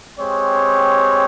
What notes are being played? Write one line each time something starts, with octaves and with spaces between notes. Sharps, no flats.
G#3 C4 G4 C#5